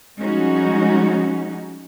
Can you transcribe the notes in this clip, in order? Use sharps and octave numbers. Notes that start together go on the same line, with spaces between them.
F3 G3 G#3 C#4 D#4 F#4